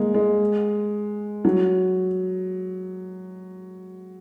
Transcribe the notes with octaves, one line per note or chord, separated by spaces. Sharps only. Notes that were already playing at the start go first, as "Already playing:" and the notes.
Already playing: G#3 A#3
G#3
F#3